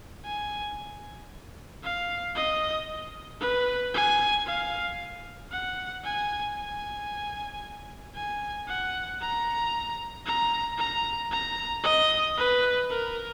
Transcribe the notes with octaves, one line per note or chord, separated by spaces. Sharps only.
G#5
F5
D#5
B4
G#5
F5
F#5
G#5
G#5
G#5
F#5
A#5
A#5
A#5
A#5
D#5
B4
A#4